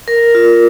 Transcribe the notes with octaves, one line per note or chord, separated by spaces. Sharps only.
A#4
F4